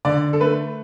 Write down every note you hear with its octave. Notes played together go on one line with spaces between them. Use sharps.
D3 D5
A4
A3 B4